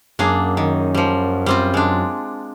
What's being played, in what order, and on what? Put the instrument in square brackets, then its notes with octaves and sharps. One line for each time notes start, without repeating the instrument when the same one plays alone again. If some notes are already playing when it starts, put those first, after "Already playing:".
[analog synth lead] F#2 [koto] A#3 D4 G#4
[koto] D#3
F3 G3
G3 C4 F4
G#3 D4